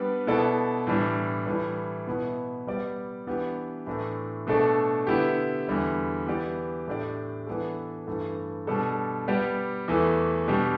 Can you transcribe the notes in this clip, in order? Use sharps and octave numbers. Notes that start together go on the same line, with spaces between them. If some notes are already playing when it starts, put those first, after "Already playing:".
Already playing: G3 B3 D4 B4 D5
B2 B3 E4 A4 D5
A2 E3 G3 D4
A2 E3 G3
B2 B3 E4
G3 B3 G4 D5
E3 B3 D4 G4
A2 E3 A3 D4
B2 A3 D4 A4 D5
D3 B3 E4 G4
E2 D3 G3 E4
E3 B3 G4 D5
A2 A3 D4 G4 D5
E3 B3 D4 A4
G2 E3 A3
B2 G3 D4 A4
G3 B3 G4 D5
E2 E3 A3
B2 G3 D4 G4